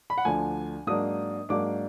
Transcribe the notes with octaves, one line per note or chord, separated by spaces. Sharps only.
B5
F#5
D2 D3 F3 G#5
G#2 F#3 A#3 D4 D#6
G#2 F#3 A#3 D4 D6